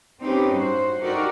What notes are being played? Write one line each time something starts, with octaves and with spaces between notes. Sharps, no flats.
C4 C#4 D#4 G4 B4
G2 F#4 C5
D#4 F#4 G4 A4 A#4 D5